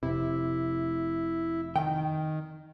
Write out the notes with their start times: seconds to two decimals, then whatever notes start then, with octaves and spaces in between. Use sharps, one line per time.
0.03 F1 C3 E4
1.76 D#3 G5